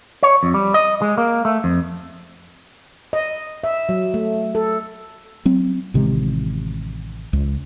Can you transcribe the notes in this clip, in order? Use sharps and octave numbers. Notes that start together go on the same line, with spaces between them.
C#5
F2
G3
D#5
G#3
A#3
A3
F2
D#5
E5
F#3
A3
A4
F#3 C4
A1 C3 D#3 G#3
C#2